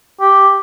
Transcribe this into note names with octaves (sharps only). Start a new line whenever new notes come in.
G4